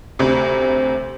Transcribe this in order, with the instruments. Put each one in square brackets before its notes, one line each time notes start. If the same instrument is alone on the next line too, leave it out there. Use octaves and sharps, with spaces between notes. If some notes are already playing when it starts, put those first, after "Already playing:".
[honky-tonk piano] D2 C3 [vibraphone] C5